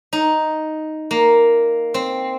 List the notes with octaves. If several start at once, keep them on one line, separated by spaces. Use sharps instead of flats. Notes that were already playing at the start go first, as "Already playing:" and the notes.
D#4
A#3
C4